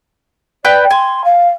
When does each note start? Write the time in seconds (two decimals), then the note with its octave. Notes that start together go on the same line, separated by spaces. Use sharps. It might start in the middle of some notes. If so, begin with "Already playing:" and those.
0.65 B4 D5 G5 G6
0.91 G#5 C6
1.24 F5